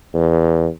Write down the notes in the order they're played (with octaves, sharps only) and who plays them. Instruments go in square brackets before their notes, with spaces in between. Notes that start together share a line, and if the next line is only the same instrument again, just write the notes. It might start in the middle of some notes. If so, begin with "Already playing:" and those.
[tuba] E2